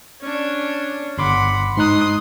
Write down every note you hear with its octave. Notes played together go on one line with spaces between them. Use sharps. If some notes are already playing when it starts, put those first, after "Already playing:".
C#4 D4
G1 F#5 B5 C6 D6
G#2 D#4 C6 D#6 F#6